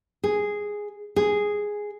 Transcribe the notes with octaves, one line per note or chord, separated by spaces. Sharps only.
G#4
G#4